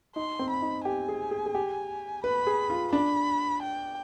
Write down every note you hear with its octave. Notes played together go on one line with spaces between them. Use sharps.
D#4 C6
C4
B5
D#4
G4 G#5
G#4
G#4
G#4
G4
B4 B5
G#4
F4
D4 B5
G5